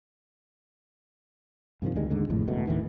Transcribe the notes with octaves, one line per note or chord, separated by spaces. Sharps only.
G2 C3 D#3 F3
D2 D#3 G3 G#3
D#2 G#2 D3 G#3
D#1 G#1 F2 A2
D#1 C#2 B2 A3
D#2 A2 D#3 E3